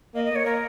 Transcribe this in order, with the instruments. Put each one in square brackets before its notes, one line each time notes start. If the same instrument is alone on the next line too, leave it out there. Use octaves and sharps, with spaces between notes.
[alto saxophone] A#3 [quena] D#5
[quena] D#5
[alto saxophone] A#3 [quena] C#5
[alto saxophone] A#3 [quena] A#4